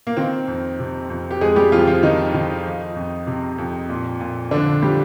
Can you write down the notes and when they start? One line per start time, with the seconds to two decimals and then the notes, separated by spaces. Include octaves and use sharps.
0.07 A#3
0.17 D#3 C4
0.48 F2
0.79 C3
1.10 F2
1.31 G4
1.41 F2 G#3 G#4
1.56 G3 G4
1.72 F2 F3 F4
1.87 F3 F4
2.03 D#3 D#4
2.34 D#3
2.65 F3
2.96 F2
3.27 C3
3.58 F2
3.89 A#2
4.21 A#2
4.51 D3 F3 D4
4.82 F3 G3 G4